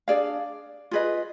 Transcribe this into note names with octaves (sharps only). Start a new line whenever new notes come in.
D4 G#4 D5 F5
F4 G#4 B4 D#5